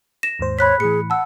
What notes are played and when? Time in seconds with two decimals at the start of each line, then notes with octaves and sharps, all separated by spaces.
0.23 A#6 E7
0.39 D#2 G#2 C5
0.59 C#5 B5 F#6 B6
0.80 A2 E3 G#4 C#7
1.10 F#5 A5 E6